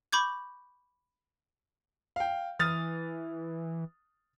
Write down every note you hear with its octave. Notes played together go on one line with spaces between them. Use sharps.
B5 C#6 D6 G6 G#6
F5 G5
E3 D#6 F6 A6